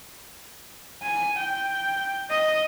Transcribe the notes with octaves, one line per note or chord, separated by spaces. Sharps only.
G#5
G5
D#5